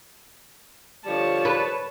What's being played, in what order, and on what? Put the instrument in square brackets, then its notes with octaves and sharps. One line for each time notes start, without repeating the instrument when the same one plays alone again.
[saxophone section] D3 F3 G3 [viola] C#5 A5
[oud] B4